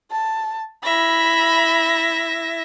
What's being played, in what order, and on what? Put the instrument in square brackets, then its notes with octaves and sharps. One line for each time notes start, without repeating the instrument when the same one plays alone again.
[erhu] A5
[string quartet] E4 E5 A#6 [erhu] B5